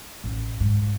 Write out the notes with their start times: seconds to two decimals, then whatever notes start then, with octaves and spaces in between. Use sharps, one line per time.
0.24 A1
0.60 G#2